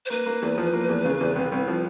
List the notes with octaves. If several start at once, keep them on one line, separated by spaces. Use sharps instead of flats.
C5
A#3 B4
A#3
E2
F3
A#3
E2
C#3
E2
C2
C2
F3